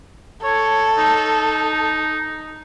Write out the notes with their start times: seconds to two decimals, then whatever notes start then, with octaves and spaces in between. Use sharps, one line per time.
0.44 A4 C#5
0.97 D#4